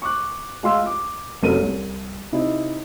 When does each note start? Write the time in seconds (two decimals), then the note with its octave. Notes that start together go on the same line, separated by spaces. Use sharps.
0.02 C#6 D6 F#6
0.63 G#3 F4 C6 E6
0.86 D6
1.43 F#1 C3 F#3 A4 A#4 D#7
1.62 C2
2.32 C3 D#4 E4